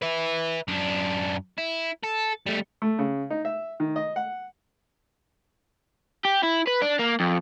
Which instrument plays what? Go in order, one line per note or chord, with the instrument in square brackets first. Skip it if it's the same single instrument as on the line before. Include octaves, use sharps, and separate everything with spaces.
[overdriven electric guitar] B4 E5
F#2 D4
E4
A4
G3 A3
[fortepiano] A3
C#3
D#4
E5
D#3
D#5
F#5
[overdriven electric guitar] G4
E4
B4
D4
A#3
F2